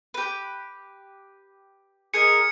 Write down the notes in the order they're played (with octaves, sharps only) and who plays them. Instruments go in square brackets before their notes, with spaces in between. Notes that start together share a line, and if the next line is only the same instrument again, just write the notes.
[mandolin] G4 B4
[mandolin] G#4 A#4 D#5 [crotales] G#6 C#7